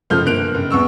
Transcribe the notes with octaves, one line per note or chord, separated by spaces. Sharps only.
F#1 F3 A3 F6 G6
G1 A#3 F#6 D7 F7
F#1
E2 B3 C#6 E6